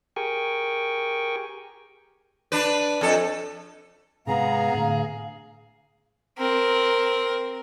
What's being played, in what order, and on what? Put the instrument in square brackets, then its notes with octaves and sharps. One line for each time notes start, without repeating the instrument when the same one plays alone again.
[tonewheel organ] G4 G#4 A#4 G5 G#5 C#6
[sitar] D4 B4
F2 A4
[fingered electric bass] G#2 C3 [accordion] B3 A#5 [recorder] G#4 [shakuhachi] F5
[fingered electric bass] A2 D3
[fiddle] C4 A#4